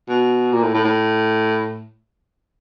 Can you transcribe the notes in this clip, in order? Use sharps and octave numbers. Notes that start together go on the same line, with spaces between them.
B2
A#2
A2
A2
A2